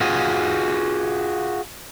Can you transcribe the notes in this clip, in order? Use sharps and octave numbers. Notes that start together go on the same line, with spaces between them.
F4 F#4 G#4